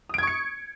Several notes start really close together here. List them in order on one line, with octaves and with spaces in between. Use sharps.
D#6 D7 G#6 C#6 C#7